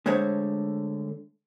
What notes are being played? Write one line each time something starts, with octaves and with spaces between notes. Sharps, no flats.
D3 G#3 A3 C5 C#5